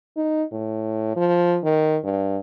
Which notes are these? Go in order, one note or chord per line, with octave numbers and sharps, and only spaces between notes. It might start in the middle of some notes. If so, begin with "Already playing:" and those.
D#4
A2
F3
D#3
G2